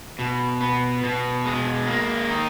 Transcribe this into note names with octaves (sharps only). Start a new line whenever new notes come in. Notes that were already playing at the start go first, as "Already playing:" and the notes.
B2
B3
B2
G#3
A#3
D#4